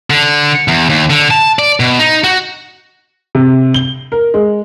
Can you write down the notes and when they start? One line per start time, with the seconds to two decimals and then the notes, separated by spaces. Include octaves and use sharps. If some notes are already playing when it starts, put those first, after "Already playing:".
0.10 D3
0.68 E2
0.89 D#2
1.10 D3
1.31 A5
1.59 D5
1.80 B2
1.99 D#4
2.24 F#4
3.35 C3
3.74 G7
4.12 A#4
4.34 G#3